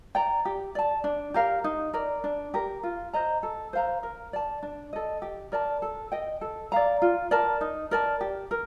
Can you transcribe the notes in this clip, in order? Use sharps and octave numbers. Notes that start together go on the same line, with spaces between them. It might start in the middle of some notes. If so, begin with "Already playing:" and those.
D5 G5 A#5
G4
D5 A5
D4
G4 A#4 F5
D#4
A#4 D5
D4
G4 A#4
F4
C5 D#5 A#5
A4
C5 F5 A#5
A#4
D5 A5
D4
A4 D#5
G4
A#4 D5 A5
A4
D#5 G5
A4
D5 F5 A#5
F4
A#4 D5 A5
D#4
A#4 D5 A5
G4
A#4